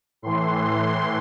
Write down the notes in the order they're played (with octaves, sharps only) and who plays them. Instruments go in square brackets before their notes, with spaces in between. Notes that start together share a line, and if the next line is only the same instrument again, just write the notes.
[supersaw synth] A2 E3 C6